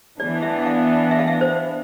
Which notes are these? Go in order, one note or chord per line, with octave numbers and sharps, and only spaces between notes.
E3 B3 D4 D5
E5
F5
E5
F5
E5
C5